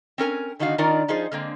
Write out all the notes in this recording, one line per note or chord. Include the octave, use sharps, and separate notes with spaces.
C4 C#4 A#4 G#5
D3 D#3 D4 D#4 F#4 F5
D#3 D4 D#4 F4 A#4 D5
F3 D#4 F4 G#4 C5
D3 G#3 A#3 C4